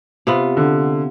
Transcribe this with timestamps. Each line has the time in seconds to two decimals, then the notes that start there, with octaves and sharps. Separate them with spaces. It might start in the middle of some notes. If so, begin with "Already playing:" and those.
0.27 C3 B3 F4
0.57 D3